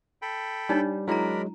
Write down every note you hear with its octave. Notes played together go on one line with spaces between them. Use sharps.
A4 G5 B5
G3 D4 D#4 C#5
F#3 G#3 D4 E4 A#4 A#5 B5